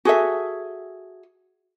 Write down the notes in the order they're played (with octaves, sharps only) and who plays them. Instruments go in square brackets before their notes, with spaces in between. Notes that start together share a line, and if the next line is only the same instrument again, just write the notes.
[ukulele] F#4 G#4 A4 E5